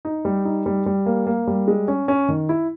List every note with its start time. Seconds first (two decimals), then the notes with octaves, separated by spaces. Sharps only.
0.05 D#4
0.25 G3
0.45 D#4
0.66 G3
0.86 G3
1.06 A#3
1.27 A#3
1.47 G3
1.68 G#3
1.88 C#4
2.08 C#4
2.29 D#3
2.49 E4